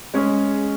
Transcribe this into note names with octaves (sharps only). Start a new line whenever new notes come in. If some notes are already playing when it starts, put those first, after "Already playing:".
G#3 C#4 G#4